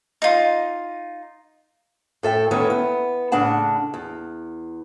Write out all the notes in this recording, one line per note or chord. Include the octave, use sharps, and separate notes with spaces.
D#4 F4
A2 A4 E5 G5
D#3 E3 A3 B3 C#4
B3
A2 C#3 D4 F#5 A5
E2